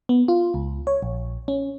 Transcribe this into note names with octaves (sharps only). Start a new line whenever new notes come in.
B3
F4
C#2
C#5
A#1
C#4